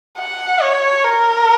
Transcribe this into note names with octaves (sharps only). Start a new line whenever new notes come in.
F#5
C#5
A#4